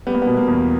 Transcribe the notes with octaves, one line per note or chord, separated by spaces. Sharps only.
G3 B3
A#3
B2 B3
A#3
E2